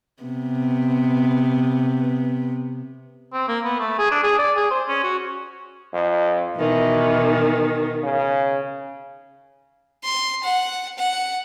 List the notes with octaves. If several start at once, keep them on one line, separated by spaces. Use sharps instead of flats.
C3 B3
C4
A#3
B3
A3
G#4
D4
G#4
D5
G#4
C5
C#4
F#4
F2
B2 D#3 E3
C#3
C6
F#5
F#5